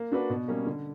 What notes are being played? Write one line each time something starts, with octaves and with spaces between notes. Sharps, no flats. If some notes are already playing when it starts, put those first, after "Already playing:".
Already playing: A#3
D4 F#4 B4 D5
B2
G3 A#3 C#4
D3